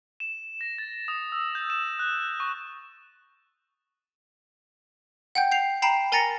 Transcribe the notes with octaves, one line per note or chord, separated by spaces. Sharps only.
E7
A#6
A6
D#6
E6
G6
E7
F#6
C#6
F#5 G5 G6
G6 C7 F7
G5 A#5 B5 C7 E7
A#4 G#5 A#5 A6 A#6 C#7